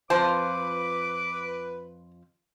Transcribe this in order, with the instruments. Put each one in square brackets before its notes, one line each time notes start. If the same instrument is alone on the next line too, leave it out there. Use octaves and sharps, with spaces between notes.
[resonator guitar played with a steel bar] F2 F4 A5 [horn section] B4 [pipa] C5 [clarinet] D6